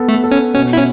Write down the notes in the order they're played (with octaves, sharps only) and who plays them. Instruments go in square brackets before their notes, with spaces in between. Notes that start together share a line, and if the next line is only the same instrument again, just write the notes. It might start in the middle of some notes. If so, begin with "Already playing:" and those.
Already playing: [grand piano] B3 A4
[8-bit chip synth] A3
[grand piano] A4
[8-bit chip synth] C#4
[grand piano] B2 [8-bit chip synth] C#4
[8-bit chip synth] E4
C#4